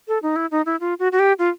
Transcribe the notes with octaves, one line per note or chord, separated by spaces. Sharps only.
A4
D#4
E4
D#4
E4
F4
F#4
F#4
G4
F4